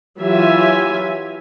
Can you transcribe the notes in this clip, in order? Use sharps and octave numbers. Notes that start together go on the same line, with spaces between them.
E3 F#3 F4 G4 E5 G#5